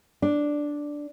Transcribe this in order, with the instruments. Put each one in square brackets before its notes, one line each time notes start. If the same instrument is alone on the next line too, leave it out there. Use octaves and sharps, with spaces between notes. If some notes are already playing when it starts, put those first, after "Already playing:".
[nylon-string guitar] D4